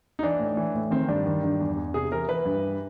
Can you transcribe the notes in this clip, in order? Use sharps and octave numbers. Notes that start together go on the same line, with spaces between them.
D#4
E3 D4
A2
E3
A2
D#3 C4
G2 D4
D#3
G2
E2
E2
C3 G#4
E3 A#4
E3 B4
G2
E3